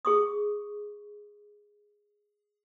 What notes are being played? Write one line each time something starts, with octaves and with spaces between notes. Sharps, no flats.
G#4 C#6 D#6